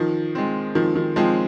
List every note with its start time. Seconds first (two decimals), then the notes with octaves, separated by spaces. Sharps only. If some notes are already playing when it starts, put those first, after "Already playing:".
Already playing: D#3 F3
0.35 G#3 C4
0.75 D#3 F3
0.95 D#3
1.16 F3 G#3 C4